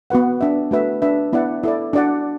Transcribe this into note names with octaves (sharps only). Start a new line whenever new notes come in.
B3 F#4 B4 F#5
D4 B4 E5
A3 F#4 B4 E5
D4 B4 E5
B3 E4 D5 F#5
E4 A4 D5
D4 F#4 D5 F#5